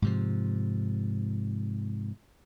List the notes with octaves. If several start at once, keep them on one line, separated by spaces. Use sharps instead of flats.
G#2 C3 F3